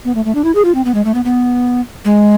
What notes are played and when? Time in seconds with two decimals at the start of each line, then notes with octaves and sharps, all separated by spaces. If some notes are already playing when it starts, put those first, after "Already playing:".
0.05 B3
0.15 A3
0.25 A3
0.35 D4
0.44 E4
0.55 G#4
0.65 F4
0.75 C4
0.85 B3
0.95 G#3
1.05 A3
1.14 B3
1.25 B3
2.05 G#3